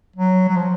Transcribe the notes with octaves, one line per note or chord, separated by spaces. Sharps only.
F#3
F#3
F3